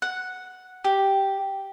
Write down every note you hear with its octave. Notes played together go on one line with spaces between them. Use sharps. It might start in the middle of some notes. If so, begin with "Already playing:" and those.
F#5
G4